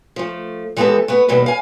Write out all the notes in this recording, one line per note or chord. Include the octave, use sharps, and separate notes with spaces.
F3 A3
E3 G#3 B3 F4 G4 A4
A3 B3 B4
D#2 B2 G3 B4
F5 G#5